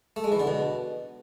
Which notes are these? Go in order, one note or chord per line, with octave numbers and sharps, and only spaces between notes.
A3
G#3
E3
D3
B2